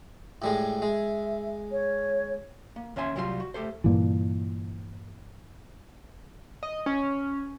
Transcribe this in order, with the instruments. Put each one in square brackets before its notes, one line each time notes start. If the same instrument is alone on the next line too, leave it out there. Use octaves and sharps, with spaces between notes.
[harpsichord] A2 G3 G#3
[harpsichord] G#3 [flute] E5
[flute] C#5
[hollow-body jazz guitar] A#3
D#2 C#4 C#5 E5 G#5 C6
C2 F#3 G3 F4 F#4 C6
F#4
A3 G4 A4 C5
[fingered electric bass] G2 A#2 E3
[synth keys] D#5
C#4